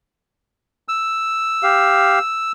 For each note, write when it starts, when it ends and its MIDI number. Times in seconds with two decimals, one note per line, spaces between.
0.88 2.52 88
1.63 2.19 67
1.63 2.19 77